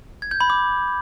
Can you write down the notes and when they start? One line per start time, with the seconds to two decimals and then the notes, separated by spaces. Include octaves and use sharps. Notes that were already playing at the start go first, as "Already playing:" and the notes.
0.22 G#6
0.31 G6
0.41 B5
0.50 D6